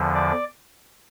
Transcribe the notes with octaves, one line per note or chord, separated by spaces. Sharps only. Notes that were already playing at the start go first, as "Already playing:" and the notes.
Already playing: E2 D3 F3
D5